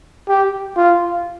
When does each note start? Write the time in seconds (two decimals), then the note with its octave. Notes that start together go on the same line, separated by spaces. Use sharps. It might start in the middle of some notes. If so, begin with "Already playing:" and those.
0.28 G4
0.77 F4